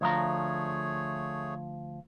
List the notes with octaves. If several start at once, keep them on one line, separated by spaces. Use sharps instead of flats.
D2 F3 A3 G#4 C#5 A#5